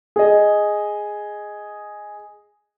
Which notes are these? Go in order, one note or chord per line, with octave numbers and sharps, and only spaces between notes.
G#4 D#5